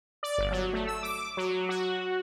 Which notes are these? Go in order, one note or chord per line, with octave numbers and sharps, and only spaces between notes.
D5
G1
F#3
A3
E6
D6
F#3
F#4